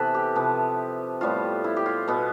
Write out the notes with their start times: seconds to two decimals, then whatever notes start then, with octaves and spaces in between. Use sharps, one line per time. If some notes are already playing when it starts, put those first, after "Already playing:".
Already playing: C3 E3 B3 A4 B4
0.14 G4
0.36 C3 F3 B3
1.21 A2 G3 B3 F4
1.64 E4
1.77 G4
1.86 F4
2.08 B2 B3